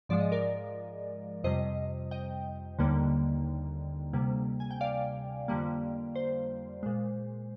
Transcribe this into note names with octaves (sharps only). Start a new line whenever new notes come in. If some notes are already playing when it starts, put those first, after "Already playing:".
G#2 F3 G#3 D5
D#5
A#4 D5
F2 C3 G3 C5 D#5
D#5 G5
D#2 D3 G3 A#3
D2 C3 G3 A#3
G#5
G5
D5 F5
F2 D3 G3 A#3
C5
A#2 G#3